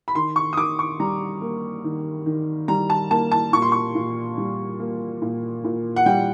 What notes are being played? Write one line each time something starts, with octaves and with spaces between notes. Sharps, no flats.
B5
D#3 C6
C#6
D#6
D#3 D6
C#6
G3 A#5
A#3
D#3
D#3
G3 A#5
A5
A#3 A5
A5
A#2 C#6
C6
C#6
A#2
G3
A#3
A#2
A#2
F#5
G3 G5